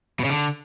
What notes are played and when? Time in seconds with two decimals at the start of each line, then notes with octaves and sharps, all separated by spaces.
0.19 B2
0.25 C#3
0.30 D3